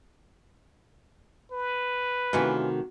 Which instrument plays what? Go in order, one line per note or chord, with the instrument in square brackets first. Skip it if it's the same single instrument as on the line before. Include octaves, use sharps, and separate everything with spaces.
[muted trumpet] B4
[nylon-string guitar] C3 D#3 A3 [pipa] E3 C#4 F4 [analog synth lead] F#4